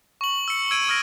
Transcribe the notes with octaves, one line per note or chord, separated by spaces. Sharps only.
C#6 F#7
E6 C#7
E6 G#6 D7 D#7
D#6 F6 G#6 A#6 D7